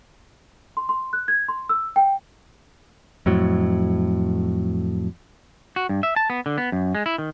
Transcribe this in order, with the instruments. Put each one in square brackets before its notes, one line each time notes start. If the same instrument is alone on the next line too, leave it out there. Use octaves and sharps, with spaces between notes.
[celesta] C6
C6
F#6
G#6
C6
E6
G5
[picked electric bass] F2 A2 F#3
[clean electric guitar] F#4
G2
E5
A5
B3
D3
B3
F#2
G#3
E4
D#3